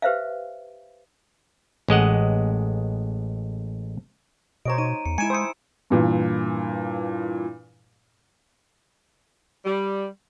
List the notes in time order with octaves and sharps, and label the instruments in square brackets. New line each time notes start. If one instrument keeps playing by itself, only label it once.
[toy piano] G4 B4 C5 E5 F5
[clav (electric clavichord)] A1 G#3 D#5 F#5
[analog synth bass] B2 [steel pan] C5 C#5 D#5 [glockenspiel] A#5 D7
[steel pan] D#4 C#5 [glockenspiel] D#7
[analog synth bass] E2 [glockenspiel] C#7
[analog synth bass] G#3 [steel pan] E4 G#5 [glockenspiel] C#7 D7 E7
[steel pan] C5 D#6 [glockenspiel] E6 C#7
[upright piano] G2 A#2 E3
[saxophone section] G3